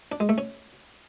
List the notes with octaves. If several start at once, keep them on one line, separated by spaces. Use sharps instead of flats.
D4
G#3
A3
C#4